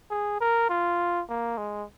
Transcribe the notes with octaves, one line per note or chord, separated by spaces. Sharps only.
G#4
A#4
F4
A#3
G#3